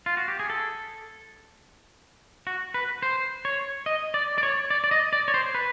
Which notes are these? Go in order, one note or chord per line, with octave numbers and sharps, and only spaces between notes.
F4
F#4
G4
G#4
A4
F#4
B4
C5
C#5
D#5
D5
D5
C#5
D5
D5
D#5
D5
C#5
C5
B4